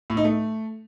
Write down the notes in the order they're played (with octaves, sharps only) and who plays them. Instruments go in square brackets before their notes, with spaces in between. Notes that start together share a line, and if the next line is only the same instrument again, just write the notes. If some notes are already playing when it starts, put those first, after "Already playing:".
[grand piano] A2
D#4
A3